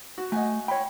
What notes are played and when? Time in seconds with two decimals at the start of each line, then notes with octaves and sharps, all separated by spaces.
0.18 F#4
0.32 A3 D#5 F#5 G#5
0.68 C#5 G5 B5